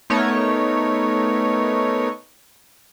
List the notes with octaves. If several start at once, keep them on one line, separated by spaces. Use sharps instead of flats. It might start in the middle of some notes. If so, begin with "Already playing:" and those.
A3 B3 D#4 A#4 C#5